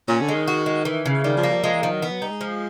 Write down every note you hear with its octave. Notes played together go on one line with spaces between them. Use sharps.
A#2 C#4
D3
G#3
D#3
F#4
G#3
E3
C#3
D#3 G3
F3
A#3
F3
F3 G#3
E3
D#3 F3
F#3
E3 B3
F#3
G3 D#4
G#3
F3